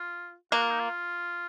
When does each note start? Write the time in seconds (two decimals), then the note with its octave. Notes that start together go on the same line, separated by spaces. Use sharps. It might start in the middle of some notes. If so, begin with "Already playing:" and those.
Already playing: F4
0.52 A#3 F#4
0.62 F4
0.71 D#4
0.80 F4